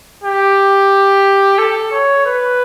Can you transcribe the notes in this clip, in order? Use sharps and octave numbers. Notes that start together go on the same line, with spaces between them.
G4
A4
C#5
B4